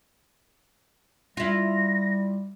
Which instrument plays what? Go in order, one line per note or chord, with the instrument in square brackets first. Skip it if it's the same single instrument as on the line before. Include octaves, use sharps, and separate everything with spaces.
[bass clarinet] G3 [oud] E4 F4 [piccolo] A#6